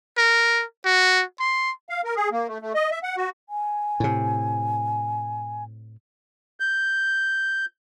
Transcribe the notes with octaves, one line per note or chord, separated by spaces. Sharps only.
A#4
F#4
C6
F5
A#4
G#4
A#3
A3
A3
D#5
E5
F#5
F#4
G#5
A2 C3
G6